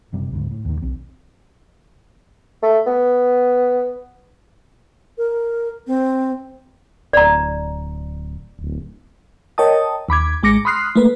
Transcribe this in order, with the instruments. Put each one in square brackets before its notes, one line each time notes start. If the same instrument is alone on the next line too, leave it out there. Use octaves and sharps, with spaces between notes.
[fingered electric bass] F#1 C3 G3
D1 D2 G#2
A2
D#2 D#3
B1 C4
[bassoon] A3
B3
[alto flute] A#4
C4
[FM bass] D1 [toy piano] D5 A#5
[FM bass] D1
[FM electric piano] A#4 C#5 D#5 G5 A5 D#6
D#2 B5 D6 G#6
A1 G#3 D6 A#6 C#7
B5 C6 D#6 F6 F#6 C7
A3 A#3 B4